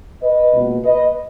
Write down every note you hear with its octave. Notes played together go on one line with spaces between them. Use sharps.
B4 D#5
C#2 B2 A#3
B4 D#5